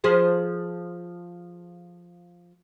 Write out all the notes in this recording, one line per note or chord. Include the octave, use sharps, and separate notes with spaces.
F3 G#4 C5